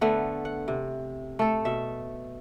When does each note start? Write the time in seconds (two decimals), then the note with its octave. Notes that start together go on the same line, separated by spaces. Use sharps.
0.01 D3 A3 B3
0.45 F#5
0.68 C3
1.39 A3 A4
1.65 B2 E5